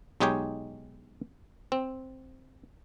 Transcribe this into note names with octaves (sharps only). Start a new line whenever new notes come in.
B1 G#3 D#4 G4 C#5 G5
C4